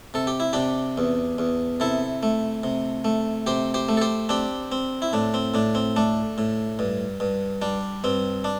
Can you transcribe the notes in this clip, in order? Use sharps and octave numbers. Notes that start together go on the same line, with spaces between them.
C3 A4
G4
E4
C3 D4 G4
E2
E2
C3 E4 A4
A3
C3
A3
C3 G4 C5
G4 C5
A3
A4
G4 C5
C4 D4 G4
C4
E4
A2 D4
C4
A2 D4
C4
A3 D4
A2
G2
G2
G3 D4
G2 C4
D4